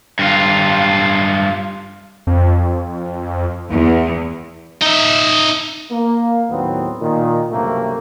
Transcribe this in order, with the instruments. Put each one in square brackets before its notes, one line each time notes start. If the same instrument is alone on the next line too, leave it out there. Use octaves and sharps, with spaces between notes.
[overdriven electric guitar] G2 F4
[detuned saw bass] F2
[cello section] E2
[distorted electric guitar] D#4 E5
[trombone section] A#3
D#2 A2 D#3 F#3 B3 C4
A#2 D#3
C#2 G2 C3 F#3 A3 A#3